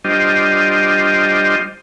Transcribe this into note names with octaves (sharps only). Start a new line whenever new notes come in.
G3 D4 F4 G4 C5 D#5